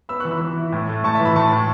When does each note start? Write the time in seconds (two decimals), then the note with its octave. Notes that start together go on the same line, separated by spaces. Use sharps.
0.09 B3 B5 E6
0.20 C#6 F#6
0.25 E3
0.31 B5 E6
0.41 E3
0.57 E4
0.72 A2
0.89 A3
1.04 A2 A5 C#6
1.15 E5 A5
1.20 E3
1.25 B5 E6
1.36 A2 A5 C#6
1.52 A2